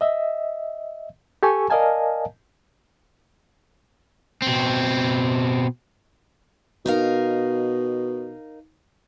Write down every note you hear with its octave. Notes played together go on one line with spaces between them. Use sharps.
D#5 E5
G4 A4 G#5 C#6
A#4 D5 D#5 F5 G#5 A5
B2 C4
B2 D#4 A#4 F5